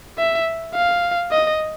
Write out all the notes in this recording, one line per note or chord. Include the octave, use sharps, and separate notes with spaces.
E5
F5
D#5